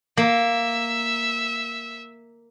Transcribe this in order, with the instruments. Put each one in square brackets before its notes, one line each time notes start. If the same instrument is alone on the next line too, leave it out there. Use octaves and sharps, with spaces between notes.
[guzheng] A#3 [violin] E5